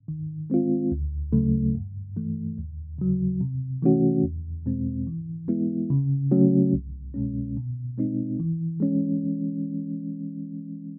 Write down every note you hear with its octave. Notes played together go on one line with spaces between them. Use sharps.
D#3
G#3 C4 F4
D2
C#3 F#3 A3
G2
E3 A3
D#2
C#3 F#3
C3
E3 A3 C#4 F#4
E2
B2 G#3 C4
E3
G#3 B3 E4
C#3
F#3 A3 C#4 F#4
C2
B2 G#3 C#4
B2
G#3 C4 D#4
E3
G#3 C#4